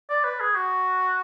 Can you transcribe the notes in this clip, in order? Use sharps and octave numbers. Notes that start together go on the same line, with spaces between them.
D5
B4
G#4
F#4